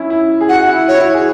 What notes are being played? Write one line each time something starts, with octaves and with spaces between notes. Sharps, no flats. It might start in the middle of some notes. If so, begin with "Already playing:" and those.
Already playing: C#4 E4
E4
G#4
F#4 F#5
E4
F#4 C#5
E4
F#4
G#4